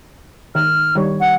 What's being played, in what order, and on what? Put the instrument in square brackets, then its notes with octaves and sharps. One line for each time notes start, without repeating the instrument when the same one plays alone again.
[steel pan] D#3 [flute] F6
[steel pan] D#3 G3 C#5
[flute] F#5